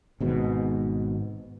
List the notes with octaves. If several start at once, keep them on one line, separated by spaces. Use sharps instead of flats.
G#1 G#2 B2